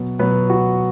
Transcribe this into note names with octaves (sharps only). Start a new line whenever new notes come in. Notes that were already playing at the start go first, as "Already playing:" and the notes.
Already playing: B2 F#3 B3
B2 F#3 B3 B4
F#4